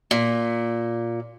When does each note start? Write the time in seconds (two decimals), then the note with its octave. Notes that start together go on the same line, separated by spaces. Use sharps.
0.11 A#2